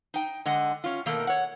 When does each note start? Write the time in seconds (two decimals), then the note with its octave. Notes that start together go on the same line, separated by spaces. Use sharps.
0.14 D#4 G5
0.46 D3 G#3 D#5 F#5
0.84 C#4 F4
1.06 B2 D#3 A3 A#3 A4 A#4
1.27 C#5 F#5